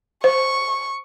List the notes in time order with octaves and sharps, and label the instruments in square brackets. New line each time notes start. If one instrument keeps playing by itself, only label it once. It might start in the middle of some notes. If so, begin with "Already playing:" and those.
[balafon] C5 [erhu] C#6